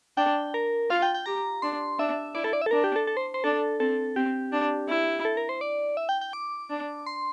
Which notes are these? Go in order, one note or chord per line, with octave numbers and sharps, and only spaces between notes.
D4 G5
A#4
F4 F5
G5
G5
G4 A#5
D4 C6
D4 E5
E4 D5
A4
D5
E5
A4
D4 A#4
G4
A4
A4
C5
C5
D4 A4
C4 A4
C4 G4
D4
E4
A4
A#4
C5
D5
E5
G5
G5
D6
D4
C6